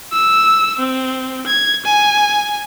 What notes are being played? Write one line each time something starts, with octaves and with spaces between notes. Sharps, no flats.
E6
C4
G#6
G#5